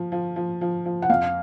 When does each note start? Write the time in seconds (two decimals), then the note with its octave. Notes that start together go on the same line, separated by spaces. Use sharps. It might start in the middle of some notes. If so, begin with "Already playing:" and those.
Already playing: F3
0.12 F3
0.36 F3
0.61 F3
0.85 F3
1.02 F#5
1.10 F2 F5